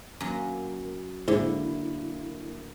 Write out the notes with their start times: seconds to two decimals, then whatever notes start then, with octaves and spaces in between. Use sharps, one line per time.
0.21 F#2 F#3 A#3
1.28 G#2 D3 A#3 E4